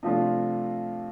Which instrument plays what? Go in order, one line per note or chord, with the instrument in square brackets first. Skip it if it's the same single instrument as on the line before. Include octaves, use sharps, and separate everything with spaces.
[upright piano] C3 F3 A3 D4 F4